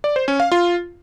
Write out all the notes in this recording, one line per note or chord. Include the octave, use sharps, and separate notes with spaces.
D5
C5
C#4
F5
F4